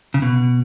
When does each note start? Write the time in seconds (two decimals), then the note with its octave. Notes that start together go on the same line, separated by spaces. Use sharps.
0.14 C#3
0.22 B2